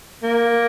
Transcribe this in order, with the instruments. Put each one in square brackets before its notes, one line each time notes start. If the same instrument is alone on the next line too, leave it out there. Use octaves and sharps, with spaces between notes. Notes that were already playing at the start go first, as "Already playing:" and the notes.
[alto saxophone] A#3